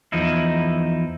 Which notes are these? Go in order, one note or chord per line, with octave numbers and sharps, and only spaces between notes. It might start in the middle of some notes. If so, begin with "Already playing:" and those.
E2 F3 D#4 E4